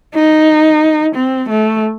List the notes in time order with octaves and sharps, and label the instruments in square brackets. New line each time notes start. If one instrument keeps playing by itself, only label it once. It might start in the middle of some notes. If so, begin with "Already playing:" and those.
[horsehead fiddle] D#4
C4
A3